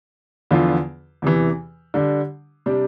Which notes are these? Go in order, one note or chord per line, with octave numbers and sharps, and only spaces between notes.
E2 D3 F3 B3 F4
E2 C3 E3
D3 G3 D4
C3 G3 D4